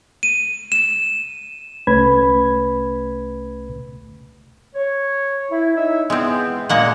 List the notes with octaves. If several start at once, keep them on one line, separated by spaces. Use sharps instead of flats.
D#7
E7
C2 A3 C#4 B4 B5 G#6
C#5
E4
D#4 E5
E2 G#3 B3 C4
A#2 G#3 A#3 F#5